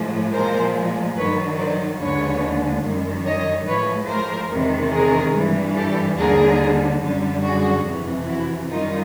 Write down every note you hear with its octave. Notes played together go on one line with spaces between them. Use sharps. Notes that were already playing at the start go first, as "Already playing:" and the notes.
Already playing: A2 F3 G#3
A#2 F3 G#3 A#4 C5
G2 D#3 F#3 B4 C#5
C5 D5
D#2 D3 F3 G#3 B4 C#5
F#2 D#3 G3
C#5 D#5
A2 F3 G#3 B4 C#5
A#4 C5
E2 C3 D#3 G#3
G#4 A#4
G2 E3 G3
G4 A4
D#2 D3 G3 G#4 A#4
F#2 D3 G3
F#4 G#4
F2 C3 E3
E4 F#4
F#2 D#3 G3 D#4 F4